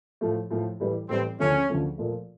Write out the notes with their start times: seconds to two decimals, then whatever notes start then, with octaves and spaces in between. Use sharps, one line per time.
0.21 A2 F3 A3
0.51 A2 F3 A3
0.80 A2 E3 G3
1.09 A2 E3 G3 C4
1.39 D2 C#3 F3 A3 C#4
1.69 D2 C#3 F3 A3
1.98 A#2 F3 A3